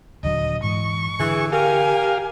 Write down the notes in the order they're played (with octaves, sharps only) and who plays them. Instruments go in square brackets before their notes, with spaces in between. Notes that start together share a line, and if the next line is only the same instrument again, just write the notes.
[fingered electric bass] D#1 D3 F#3 [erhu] D#5
[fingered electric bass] G#2 E3 [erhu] C#6
[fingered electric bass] D3 [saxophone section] E3 [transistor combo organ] G#4
[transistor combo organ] G4 F5 [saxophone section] A#4 [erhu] G#5